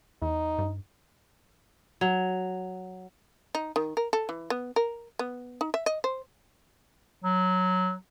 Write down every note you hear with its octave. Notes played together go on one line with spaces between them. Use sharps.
E2 D#4
G2
F#3
D#4
D#3
A#4
A4
E3
B3
A#4
B3
D#4
E5
D#5
C5
F#3